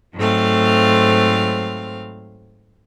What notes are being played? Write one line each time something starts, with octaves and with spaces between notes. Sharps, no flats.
G#2 F#3 A3 C4 F5